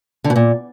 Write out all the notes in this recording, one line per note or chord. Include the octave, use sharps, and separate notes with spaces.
D3
B2
A#2